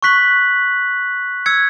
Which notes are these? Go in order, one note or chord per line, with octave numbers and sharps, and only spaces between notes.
C#6 F#6 B6 F#7
E6 G#6 C#7